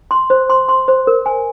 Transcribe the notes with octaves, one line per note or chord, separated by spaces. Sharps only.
C6
C5
C6
C6
C5
A#4
G#5